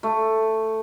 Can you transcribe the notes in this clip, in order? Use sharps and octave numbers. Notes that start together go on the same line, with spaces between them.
A3